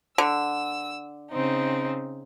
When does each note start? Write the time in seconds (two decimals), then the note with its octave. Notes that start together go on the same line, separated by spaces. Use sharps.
0.18 D3 E6
1.31 C#3 C4 D#4